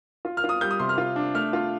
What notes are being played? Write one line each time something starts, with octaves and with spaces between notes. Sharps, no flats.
F4
F6
F4
D#6
G3 G6
D#6
C3 C6
F6
F4
D4
A3 F6
F4